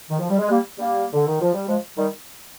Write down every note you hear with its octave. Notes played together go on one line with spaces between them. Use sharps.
D#3
F3
G3
G#3
G3 A#3
G3 A#3
D3
D#3
F3
G3
F3 G#3
D#3 G3